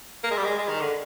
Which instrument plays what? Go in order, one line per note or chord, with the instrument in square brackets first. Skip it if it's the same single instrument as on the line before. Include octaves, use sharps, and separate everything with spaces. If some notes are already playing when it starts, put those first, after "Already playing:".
[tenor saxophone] A#3
G#3
G3
G#3
G#3
D#3
D3